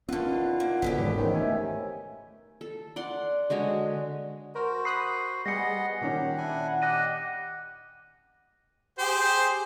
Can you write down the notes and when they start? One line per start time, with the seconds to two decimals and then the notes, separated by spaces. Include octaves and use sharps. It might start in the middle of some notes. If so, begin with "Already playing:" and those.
0.09 E2 D3 D#3 C4 C#4 F4 B4 F#5
0.60 A#3
0.82 F#1 D2 B2 D3 B3 C#4 G4
0.98 C#2 G#2 D#3 E3
1.17 A2 D#3 E3 C4
1.34 A3 E5 G#5
2.61 A4
2.96 D5 F#5 C6
3.50 D3 G#3 F#4 C#5
4.55 F#4 A#4 C5
4.85 B5 D#6 F#6 C7
5.46 G3 B3 G#4 D#5 F#5 A#6 C#7
6.01 A#2 D#3 C#4 G4 F#5
6.38 D4 E4 G#5
6.82 G4 D5 D#5 F#6 A#6 D#7
8.99 G4 G#4 C5